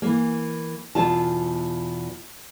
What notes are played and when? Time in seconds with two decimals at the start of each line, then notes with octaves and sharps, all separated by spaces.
0.02 E3 A#3
0.95 E2 B2 F4 A5